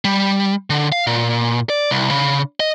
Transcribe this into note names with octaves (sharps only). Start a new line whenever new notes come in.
G3
D3
F5
A#2
D5
C2
C#3
D#5